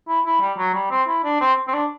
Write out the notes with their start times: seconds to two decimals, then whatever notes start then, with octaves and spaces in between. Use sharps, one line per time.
0.08 E4
0.26 E4
0.41 G3
0.58 F#3
0.74 G3
0.91 C4
1.08 E4
1.24 D4
1.41 C4
1.68 C4
1.73 D4